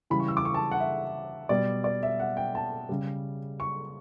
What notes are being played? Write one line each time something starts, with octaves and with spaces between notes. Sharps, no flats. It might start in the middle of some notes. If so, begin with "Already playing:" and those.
C#3 E3 G3 B5
C#6
E6
D6
C#6
A5
F#5
E5
B2 G3 D5
D5
E5
F#5
G5
A5
C#3 G3
C#6